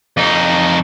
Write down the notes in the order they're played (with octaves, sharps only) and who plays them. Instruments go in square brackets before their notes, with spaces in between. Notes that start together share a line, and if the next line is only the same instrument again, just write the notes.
[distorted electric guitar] F2 D#4